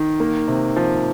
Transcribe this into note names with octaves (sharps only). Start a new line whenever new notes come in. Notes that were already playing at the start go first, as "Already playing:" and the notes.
Already playing: D#3
A#3
C3
F3